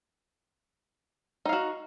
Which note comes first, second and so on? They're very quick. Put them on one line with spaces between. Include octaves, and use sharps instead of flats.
D#4 F5 F#4